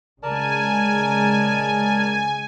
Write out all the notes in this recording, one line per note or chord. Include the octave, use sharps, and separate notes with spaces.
C#3 G#3 A#4 D5 G#5 A5